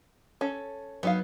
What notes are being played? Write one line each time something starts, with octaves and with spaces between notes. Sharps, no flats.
C#4 A4
F#3 B3 D#4 F5